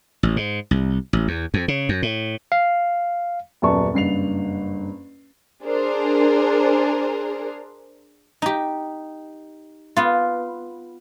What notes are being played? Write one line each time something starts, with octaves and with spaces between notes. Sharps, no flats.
A1
G#2
C2
A1
E2
F2
C#3
F#2
A2
F5
D#1 F#2 B3 D5 A5 C#6
F#1 G2 C7 F7
D4 G#4 A#4 C5
D#4 G4
B3 F4